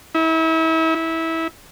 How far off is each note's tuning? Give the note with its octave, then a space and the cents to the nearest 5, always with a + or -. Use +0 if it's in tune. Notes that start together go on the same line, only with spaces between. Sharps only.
E4 -35
E4 -20